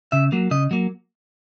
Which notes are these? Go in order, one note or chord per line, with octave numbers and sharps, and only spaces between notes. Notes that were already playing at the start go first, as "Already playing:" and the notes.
C#3 E5
F#3 A#3
C#3 D#5
F#3 A#3